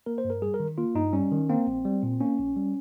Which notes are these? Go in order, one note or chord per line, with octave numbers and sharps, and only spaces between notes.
A#3 A#4
C5
G2
A#4
G3 G#4
A#4
D#3
A#3 F4
G2 D#4
G3 C#4
D#3
A#3 C4
A#1
G3
A#2
A#3 C#4
A#1
G3